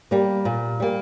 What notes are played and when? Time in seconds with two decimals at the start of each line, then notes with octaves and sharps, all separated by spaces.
0.11 G3 A#3
0.45 A#2
0.80 G3 A#3